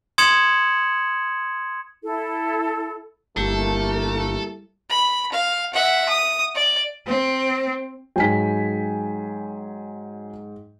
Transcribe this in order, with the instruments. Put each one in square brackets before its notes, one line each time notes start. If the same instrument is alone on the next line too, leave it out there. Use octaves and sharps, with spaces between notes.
[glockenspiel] C6 D#6 G#6 C#7 E7 F#7
[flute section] E4 A4
[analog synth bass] G1 [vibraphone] G3 E4 G4 [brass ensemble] A3 A#3 [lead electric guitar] A4
[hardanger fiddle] B5
F5
E5 F#5
D#6
D5
[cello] C4
[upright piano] G#2 G5 [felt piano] F#3 G#5 B6